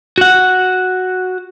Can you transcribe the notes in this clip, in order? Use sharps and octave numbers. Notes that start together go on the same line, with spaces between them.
F#4 F#5